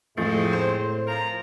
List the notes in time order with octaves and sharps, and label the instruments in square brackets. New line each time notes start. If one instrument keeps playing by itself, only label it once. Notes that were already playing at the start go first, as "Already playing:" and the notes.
[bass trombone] A2 [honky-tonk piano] F3 A3 [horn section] G#3 C4
[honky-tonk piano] C5
[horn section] F3 A#4 A#5